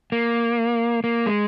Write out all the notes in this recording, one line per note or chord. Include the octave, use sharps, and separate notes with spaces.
A#3
A#3
G#3